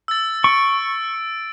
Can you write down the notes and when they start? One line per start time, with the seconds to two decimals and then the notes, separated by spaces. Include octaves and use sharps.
0.08 E6 A6
0.44 C#6 D7